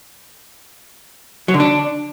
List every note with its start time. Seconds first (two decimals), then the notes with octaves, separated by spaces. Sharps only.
1.48 F#3
1.54 D3
1.60 D4